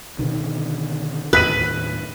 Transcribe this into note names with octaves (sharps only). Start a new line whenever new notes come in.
B2 D3 D#3
D#2 A2 B4 F#6 B6 D#7